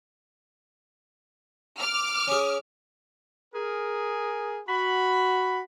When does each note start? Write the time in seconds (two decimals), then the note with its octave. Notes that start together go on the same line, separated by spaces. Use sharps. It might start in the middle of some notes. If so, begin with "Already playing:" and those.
1.79 D6 F6
2.27 C#4 G#4
3.54 G#4 A#4
4.68 F#4 B5